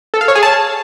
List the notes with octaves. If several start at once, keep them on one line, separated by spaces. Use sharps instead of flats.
A4
F5
C#5
G#4
A5